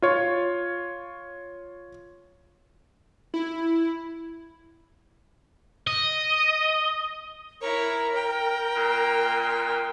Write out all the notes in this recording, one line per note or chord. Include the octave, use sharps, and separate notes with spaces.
F4 C#5
E4
D#5
E4 A#4 C#5
G5
A#2